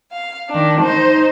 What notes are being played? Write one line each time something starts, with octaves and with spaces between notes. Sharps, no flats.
F5
D#3 D4
D#4 C5